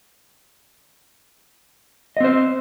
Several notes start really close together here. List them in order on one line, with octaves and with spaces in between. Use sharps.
D#5 C4 C5